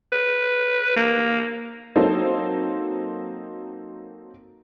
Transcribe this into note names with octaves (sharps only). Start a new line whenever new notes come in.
B4
A#3
F#3 A#3 C4 D#4 A4 C5